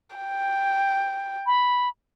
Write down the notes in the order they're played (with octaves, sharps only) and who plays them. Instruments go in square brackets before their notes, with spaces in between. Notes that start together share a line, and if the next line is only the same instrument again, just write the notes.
[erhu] G5
[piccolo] B5